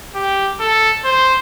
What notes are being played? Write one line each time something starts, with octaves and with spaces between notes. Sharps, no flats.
G4
A4
C5